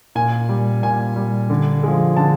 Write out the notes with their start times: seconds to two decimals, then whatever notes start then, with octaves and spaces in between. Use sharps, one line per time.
0.15 A#2 G#5
0.49 G3
0.83 A#2 G#5
1.16 G3
1.50 D3
1.83 F3 G#3
2.17 D3 A5